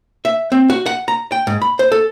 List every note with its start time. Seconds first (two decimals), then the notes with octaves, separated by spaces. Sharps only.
0.25 E5
0.52 C4
0.70 F#4
0.86 F#5
1.08 A#5
1.32 G5
1.47 G#2
1.62 B5
1.79 C5
1.92 A4